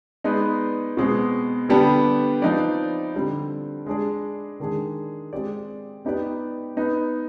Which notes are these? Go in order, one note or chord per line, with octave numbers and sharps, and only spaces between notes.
G#3 B3 D#4 B4 D5
B2 G#3 C4
D3 G3 B3 D4 G4
F3 C4 D#4 B4 D5
D3 G3 C4
G#3 D4 G#4 D5
D#3 G#3 D4 G#4
G#3 C4 G4 D5
B3 D#4 G4 B4 D5
B3 D#4 B4